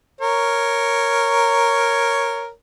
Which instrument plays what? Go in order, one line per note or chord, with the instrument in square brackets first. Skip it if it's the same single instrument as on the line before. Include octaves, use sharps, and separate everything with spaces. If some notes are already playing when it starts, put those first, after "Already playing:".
[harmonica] A#4 C#5